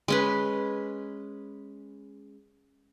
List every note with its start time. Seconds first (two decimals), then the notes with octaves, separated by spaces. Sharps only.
0.08 G#3 C#4 B4